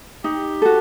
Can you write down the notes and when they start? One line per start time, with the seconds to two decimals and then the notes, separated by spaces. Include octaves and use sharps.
0.24 D#4 G4
0.62 F#4 A4